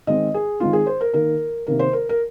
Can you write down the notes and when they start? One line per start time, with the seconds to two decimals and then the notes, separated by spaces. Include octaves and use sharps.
0.07 D#3 G#3 C4 D#5
0.34 G#4
0.60 D#3 G#3 C4 F4
0.73 G#4
0.86 C5
1.01 A#4
1.13 D#3 A#3 A#4
1.67 C3 D#3 A#3 A#4
1.79 C5
1.93 A#4
2.09 A#4